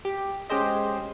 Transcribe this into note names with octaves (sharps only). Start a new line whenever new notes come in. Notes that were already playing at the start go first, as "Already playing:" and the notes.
G4
G#3 C#4 G4 G#4 C5 D#5